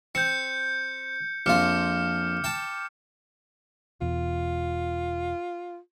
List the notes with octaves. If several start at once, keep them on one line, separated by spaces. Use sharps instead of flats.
C4 G6 C#7
A#1 F2 F4 D6 F6 C#7
G5 A5
E1 E2 B2 F4